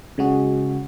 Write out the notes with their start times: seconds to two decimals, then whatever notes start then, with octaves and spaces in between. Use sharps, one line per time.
0.18 C#3 G#3 F#4 G#4